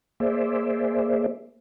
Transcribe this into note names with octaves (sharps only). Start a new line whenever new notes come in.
A#3 G#4 C5 D5 E5